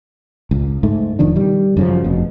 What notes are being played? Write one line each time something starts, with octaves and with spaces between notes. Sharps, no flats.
C#2
G#2 A3
E1 D#3 F3 D4
D#3 G3
F#2 C#3 F3
F1 B2